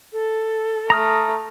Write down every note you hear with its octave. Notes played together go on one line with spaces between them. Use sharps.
A4
A3 A#5 D#6 F6